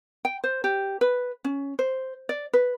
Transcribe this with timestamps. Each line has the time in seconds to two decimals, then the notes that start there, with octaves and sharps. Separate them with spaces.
0.25 G5
0.44 C5
0.64 G4
1.01 B4
1.44 C#4
1.79 C5
2.29 D5
2.53 B4